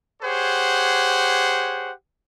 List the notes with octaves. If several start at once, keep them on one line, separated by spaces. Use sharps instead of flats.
G4 G#4 C5 C#5 F#5